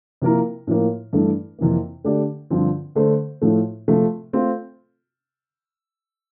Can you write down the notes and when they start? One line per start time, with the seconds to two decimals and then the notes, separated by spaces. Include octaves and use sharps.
0.22 C3 F3 A#3 E4 A#4
0.67 A2 F3 A#3
1.13 G2 E3 A3
1.59 F2 C3 E3 A#3
2.04 D3 A3 D4 G4 D5
2.50 G2 D3 F3 C4
2.95 D3 A3 D4 A4 C5
3.42 A2 F3 A3
3.88 C3 F3 A3
4.33 A3 C4 F4 A4